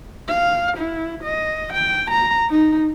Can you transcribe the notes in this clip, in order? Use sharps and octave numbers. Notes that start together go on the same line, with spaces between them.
F5
E4
D#5
G5
A#5
D#4